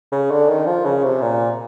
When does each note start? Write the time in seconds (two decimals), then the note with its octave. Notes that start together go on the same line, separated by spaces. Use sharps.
0.12 C#3
0.31 D3
0.49 D#3
0.66 F3
0.85 C#3
1.04 C3
1.22 A#2